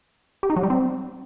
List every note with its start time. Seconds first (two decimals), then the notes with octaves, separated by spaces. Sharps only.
0.43 G4
0.50 D#4
0.56 F#3
0.63 G3
0.70 C4